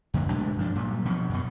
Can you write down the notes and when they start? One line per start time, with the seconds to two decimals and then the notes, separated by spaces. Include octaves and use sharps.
0.14 F2 D3 F#3 A#3
0.29 B2 G#3 A3 D4
0.57 G2 F3 D4
0.76 A#2 F#3 G3
1.05 B2 F3
1.29 F#2 B2